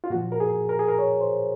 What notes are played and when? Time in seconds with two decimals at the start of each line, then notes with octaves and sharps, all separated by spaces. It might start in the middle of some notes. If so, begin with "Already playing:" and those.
0.04 F4
0.10 A#2 F3 F#4
0.32 A#4
0.40 G#4
0.69 A#4
0.79 G#4
0.88 A#4
0.99 C#5
1.21 C5